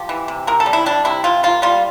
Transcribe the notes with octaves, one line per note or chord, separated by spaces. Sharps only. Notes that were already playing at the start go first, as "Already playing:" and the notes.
Already playing: F3 G4
E3
C3
C3 A#4
A4
G3
E4
G3 D4
C3 E4
C3 F4
A#3 F4
G3 F4